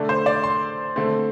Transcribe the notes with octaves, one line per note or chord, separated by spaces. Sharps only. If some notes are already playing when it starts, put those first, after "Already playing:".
Already playing: D3 A3 D4
C5
D5
C6
D3 A3 C4